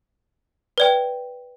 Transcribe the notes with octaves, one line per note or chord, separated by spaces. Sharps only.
B4 D5 G5